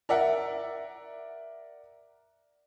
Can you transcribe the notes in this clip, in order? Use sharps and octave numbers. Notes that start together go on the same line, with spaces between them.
A#4 D5 E5 F#5